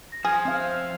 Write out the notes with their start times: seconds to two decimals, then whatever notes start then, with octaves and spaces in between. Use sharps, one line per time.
0.12 A#6
0.25 F3 G#4 F6 G#6
0.45 C4 E5 F5